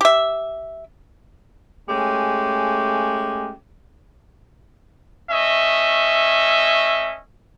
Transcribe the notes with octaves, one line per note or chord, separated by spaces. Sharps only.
G4 E5
G#3 A3 C#4 G4
A3 C#4 D#5 E5